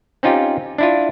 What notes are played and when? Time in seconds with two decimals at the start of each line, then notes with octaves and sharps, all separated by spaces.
0.23 C4 C#4 D#4 F4 G4
0.78 D4 E4 F4